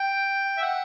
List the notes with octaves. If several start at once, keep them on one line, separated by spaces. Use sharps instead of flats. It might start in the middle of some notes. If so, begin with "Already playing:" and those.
Already playing: G5
E5
F#5